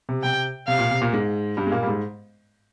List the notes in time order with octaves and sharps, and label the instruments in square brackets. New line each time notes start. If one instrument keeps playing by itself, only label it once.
[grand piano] C3
[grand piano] C3 [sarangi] G5
[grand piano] C3 [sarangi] F5
[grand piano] A#2
C3
A#2 A#3
G#2 G#3
G2 G3
G#3
A#2 A#3
G3
G#2 G#3